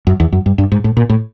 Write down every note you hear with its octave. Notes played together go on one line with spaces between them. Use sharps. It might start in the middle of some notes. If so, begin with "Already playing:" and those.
F#2
E2
F#2
G2
G2
G#2
A2
A#2
A2